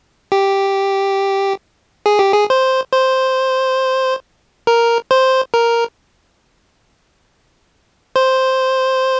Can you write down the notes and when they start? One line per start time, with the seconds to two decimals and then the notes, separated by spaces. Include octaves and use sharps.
0.32 G4
2.06 G#4
2.19 G4
2.33 G#4
2.50 C5
2.93 C5
4.67 A#4
5.11 C5
5.54 A#4
8.16 C5